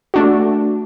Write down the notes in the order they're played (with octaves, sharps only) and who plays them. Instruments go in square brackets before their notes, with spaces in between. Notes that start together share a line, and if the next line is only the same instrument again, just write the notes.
[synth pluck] A3 D4 F#4